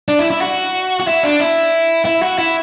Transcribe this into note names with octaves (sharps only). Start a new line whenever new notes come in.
D4
E4
E4
F#4
F#4
E4
D4
E4
E4
F#4
E4